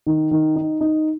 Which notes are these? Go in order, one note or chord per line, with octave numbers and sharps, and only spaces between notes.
D#3
D#3
D#4
D#4